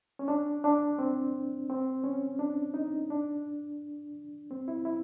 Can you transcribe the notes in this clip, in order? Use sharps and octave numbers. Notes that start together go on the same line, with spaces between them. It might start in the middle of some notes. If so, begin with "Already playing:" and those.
C#4
D4
D4
C4
C4
C#4
D4
D#4
D4
C4
E4
E4